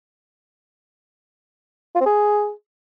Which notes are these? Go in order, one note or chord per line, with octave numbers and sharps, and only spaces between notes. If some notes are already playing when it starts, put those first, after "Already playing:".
F4
C4
G#4